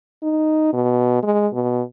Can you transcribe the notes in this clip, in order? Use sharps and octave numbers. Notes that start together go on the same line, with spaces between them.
D#4
B2
G#3
B2